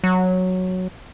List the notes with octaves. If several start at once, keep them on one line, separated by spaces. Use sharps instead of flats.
F#3